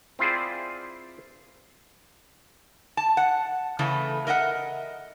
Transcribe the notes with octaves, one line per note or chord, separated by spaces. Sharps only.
C4 E4 F4 G#4 C5 D5
A5
F#5
C#3 E3 A3 A4
A#4 D#5 E5 F#5